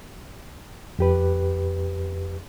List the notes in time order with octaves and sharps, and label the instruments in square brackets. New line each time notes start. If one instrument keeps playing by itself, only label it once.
[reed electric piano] F2 G4 B4